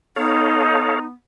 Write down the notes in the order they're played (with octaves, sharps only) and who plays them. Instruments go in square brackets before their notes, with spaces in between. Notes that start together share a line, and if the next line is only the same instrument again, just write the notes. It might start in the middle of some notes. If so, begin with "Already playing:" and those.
[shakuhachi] B3 [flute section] D#4 [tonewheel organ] A4 C#5 F5